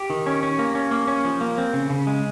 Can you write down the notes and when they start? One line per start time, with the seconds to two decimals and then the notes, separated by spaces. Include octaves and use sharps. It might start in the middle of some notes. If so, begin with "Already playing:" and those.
Already playing: G4
0.10 D#3
0.26 C#4
0.43 C#4
0.59 A#3
0.75 C#4
0.91 A#3
1.08 C#4
1.25 F3
1.41 A#3
1.58 C4
1.73 C#3
1.90 C#3
2.07 G#3